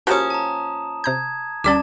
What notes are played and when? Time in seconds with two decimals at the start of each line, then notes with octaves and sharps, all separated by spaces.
0.07 F3 A#3 C#4 F#4 G4 C#5 D#6 E7
0.30 A5 A#5
1.04 C3 A#5 G6 G#6
1.64 D2 G3 C#4 D5 A5 D6 E7